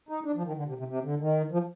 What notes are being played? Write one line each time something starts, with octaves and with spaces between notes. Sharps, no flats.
D#4
D4
F3
D#3
D3
C3
C3
C3
D3
D#3
F3